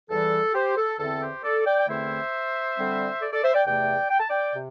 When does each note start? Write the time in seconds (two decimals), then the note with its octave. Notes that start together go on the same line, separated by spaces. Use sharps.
0.10 E2 E3 G3 A4
0.54 G4 C5
0.77 A4
0.99 E2 D3 C4 E4 A4
1.21 G4 C5
1.43 A4 D5
1.65 D5 G5
1.79 G5
1.88 E2 D3 A3 C4 E4 C5 E5
2.77 D3 G3 C4
3.21 A4 D5
3.32 A4 D5
3.44 C5 E5
3.54 D5 G5
3.66 E2 C3 A3 D5 G5
4.10 G5
4.20 A5
4.30 D5 G5
4.55 C3